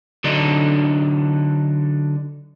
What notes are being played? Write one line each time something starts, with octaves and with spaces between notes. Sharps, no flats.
D3 F#3 D4 D#4